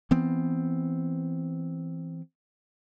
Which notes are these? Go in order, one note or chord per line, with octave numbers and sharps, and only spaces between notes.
E3 B3 C4